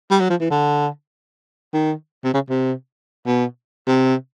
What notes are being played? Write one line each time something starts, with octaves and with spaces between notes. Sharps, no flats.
G3
F#3
F3
E3
D3
D#3
C3
C#3
C3
B2
C3